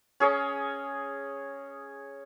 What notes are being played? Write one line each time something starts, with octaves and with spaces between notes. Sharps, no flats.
C#4 G#4 C#5 D#5